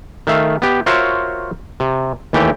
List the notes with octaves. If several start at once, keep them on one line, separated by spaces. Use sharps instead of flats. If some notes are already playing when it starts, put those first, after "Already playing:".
D#3 A3 E5 F5
B3 G4
F4 F#4 A#4 C5 C#5 E5
C3
D#2 E3 A3 G4 G5